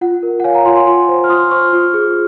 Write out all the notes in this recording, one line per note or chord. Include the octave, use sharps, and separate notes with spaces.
F4 F#5
A#4
F#5
C#5 F5 G#5
F#5 A#5
F4 G#5 C6
G#5 C6
F4
C5
F6
F4 C6 D#6
C5 C#6 F6
F4
G#4